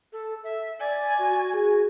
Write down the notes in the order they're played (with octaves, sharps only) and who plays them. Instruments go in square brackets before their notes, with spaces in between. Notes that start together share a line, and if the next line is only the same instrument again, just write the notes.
[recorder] A4
E5
[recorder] D5 [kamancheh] G#5
[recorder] F#4
[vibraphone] G#4